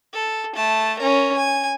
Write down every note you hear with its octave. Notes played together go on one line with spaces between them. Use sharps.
A4
A3 A5
C#4 A#4
G#5